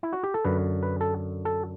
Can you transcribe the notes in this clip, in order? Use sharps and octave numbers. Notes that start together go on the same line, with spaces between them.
E4
F#4
G4
A4
F#2 D3 B4
B4
A4
A4